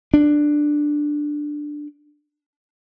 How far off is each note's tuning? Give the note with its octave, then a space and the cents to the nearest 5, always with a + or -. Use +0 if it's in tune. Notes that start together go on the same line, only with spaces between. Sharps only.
D4 +10